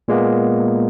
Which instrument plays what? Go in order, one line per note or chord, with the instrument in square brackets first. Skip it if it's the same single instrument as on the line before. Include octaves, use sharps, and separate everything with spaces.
[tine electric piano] A#2 G#3 A#3 B3